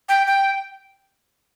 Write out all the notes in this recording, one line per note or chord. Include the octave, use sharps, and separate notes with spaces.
G5
G5